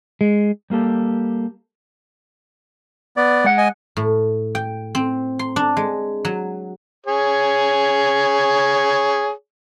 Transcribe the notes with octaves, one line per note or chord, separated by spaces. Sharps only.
G#3
G3 A#3 G4 A4
B3 D5
G#3 F#5
D#5 G#5
A2
G5
C4
C6
D4
G#3
F#3
G#4 C#5